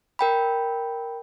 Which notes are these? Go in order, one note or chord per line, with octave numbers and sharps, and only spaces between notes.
A#4 G5 B5